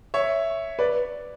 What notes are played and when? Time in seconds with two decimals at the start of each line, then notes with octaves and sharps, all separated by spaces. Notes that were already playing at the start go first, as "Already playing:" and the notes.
0.14 C#5 E5
0.79 B4 D5